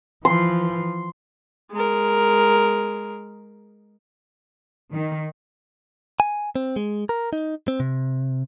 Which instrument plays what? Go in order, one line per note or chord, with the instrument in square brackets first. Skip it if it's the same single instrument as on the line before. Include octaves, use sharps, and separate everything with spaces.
[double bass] E3 F3 [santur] C6
[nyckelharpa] G#3 A#4
[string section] D#3
[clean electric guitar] G#5
C4
G#3
A#4
D#4
C4
C3